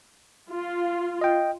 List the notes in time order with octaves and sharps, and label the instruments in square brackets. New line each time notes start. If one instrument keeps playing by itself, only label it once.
[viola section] F4
[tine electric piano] D#5 G5